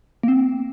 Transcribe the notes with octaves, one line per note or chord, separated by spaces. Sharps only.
A#3
C4